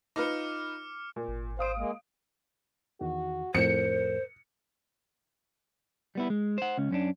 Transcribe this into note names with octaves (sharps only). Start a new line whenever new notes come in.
D#4 F4 B4 D6 F6 C#7
A#2
G#1
C5 F5 D#6 D7
G#3 A#3
E2 D#3 F#4
F2 A2 A#4 C5 C#7
G3 B3 E4
G#3
C5 F#5
C#2 C#4
F#2 C#4 D4